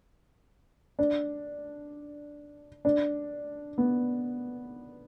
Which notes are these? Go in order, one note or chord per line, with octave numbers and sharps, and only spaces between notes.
D4
D4
B3